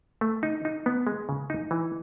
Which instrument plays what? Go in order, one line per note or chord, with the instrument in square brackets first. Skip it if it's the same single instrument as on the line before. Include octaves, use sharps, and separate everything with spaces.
[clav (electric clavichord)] A3
D#4
D#4
B3
G#3
C#3
D#4
E3